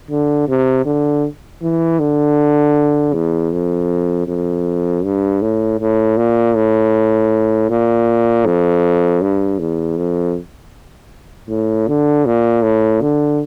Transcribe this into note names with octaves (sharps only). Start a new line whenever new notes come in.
D3
C3
D3
E3
D3
E2
F2
F2
G2
A2
A2
A#2
A2
A#2
F2
G2
E2
F2
A2
D3
A#2
A2
D3